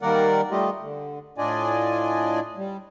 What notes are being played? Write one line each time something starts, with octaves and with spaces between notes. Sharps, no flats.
D#3 G3 A#3 A#4 D5 F#5
G3 A3 F4 G4 D#5
D3
A2 D4 F4 D5 D#5 G#5
G3